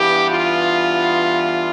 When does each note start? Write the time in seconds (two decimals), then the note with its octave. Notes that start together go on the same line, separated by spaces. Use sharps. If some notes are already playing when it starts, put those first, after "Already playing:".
Already playing: G2 E3 B3 G4
0.30 F4